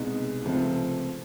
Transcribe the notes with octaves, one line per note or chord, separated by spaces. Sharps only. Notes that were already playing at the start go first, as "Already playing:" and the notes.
Already playing: C2 B2 G#3 B3 D#4
C#2 C3 F3 A3